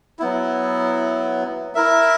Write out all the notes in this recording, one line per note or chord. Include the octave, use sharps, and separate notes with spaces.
F#3 B3 E4
E4 A#4 E5